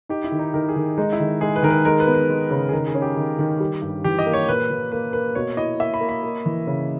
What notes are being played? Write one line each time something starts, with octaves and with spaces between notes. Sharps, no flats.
D#4 G4
E4
D#3
D#4
D#3 A#4
G#4
D#3
G#3 D#4
E4
D#3
G#3 G#4
B4
D#3 A#4
B4
G#3 A#4
B4
B3
B4
G#3
C#3
G#4
D#3 A#4
G#4
C#4
G4
D#3
D#3
G3
G2
E3 G4
D#5
A#3
C#5
A#2 B4
A#2
A#3 B4
A#3 B4
B2 C#5
E4 D#5
A#3 E5
B5
A#3
B5
A#3
E3
C#3